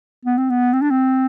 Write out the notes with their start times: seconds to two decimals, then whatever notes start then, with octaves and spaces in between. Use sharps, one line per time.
0.25 B3
0.38 C4
0.50 B3
0.73 C4
0.82 D4
0.90 C4